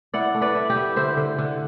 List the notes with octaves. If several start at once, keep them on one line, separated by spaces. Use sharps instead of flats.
E4 D5 F#5
A3
B4 D5
E4
G4
E4
D3 C5 E5
D3
D3